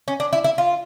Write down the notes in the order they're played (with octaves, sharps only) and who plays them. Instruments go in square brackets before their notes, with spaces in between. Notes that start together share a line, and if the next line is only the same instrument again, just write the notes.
[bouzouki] C#4
D4
E4
E4
F4